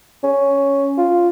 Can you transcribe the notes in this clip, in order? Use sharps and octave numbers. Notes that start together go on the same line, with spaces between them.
C#4
F4